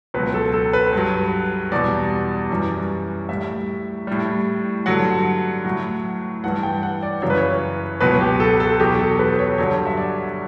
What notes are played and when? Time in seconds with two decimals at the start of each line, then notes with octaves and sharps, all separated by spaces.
0.14 C#2 B2 F#3 B4
0.34 A4
0.53 A4
0.73 B4
0.93 G2 F#3
1.71 E2 B2 G3 D5
2.50 F#2 E3 G3
3.29 A2 G3 E5
4.07 A2 G3
4.86 G2 D3 F#3 F#5
5.65 A2 F#3
6.43 G2 E3 G3 F#5
6.63 G5
6.83 F#5
7.03 D5
7.22 F#2 C#3 E3 C#5
7.30 B4
7.38 C#5
8.00 C#2 B2 F#3 B4
8.21 G4
8.40 A4
8.60 A4
8.80 E2 B2 F#3 G4
8.99 A4
9.19 B4
9.34 B4
9.39 C#5
9.58 G2 D3 F#3 C#5
9.87 E5
9.97 D5